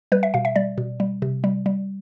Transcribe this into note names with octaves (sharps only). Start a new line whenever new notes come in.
G3 B4
E5
B2 F5
E5
G3 D5
B2
G3
C3
G3
G3